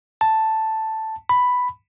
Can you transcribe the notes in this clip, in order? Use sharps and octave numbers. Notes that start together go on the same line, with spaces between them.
A5
B5